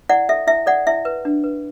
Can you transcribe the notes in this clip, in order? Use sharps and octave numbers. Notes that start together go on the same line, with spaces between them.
E4 D5 F#5
A4 E5
E4 E5
A4 D5 F#5
E4 E5
B4
D4
B4